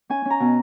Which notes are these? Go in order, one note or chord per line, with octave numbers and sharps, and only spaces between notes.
C#4 G#5
C#4
A#5
B2